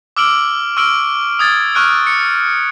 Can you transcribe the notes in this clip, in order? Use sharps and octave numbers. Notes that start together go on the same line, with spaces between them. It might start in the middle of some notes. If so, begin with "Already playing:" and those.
D6 E6 F6 D7 F#7
C#6 E6 F6 D7 F#7
D#6 G#6 A6
C#6 F6 F#6 D7
C#7